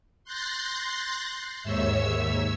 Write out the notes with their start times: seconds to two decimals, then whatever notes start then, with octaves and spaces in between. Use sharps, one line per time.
0.24 C6 F#6 G6 A6 A#6 C7
1.63 D#2 G#2 C#5 E5 E6